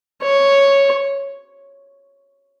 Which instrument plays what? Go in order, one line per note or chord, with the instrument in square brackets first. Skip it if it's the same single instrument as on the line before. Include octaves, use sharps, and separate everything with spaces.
[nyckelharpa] C#5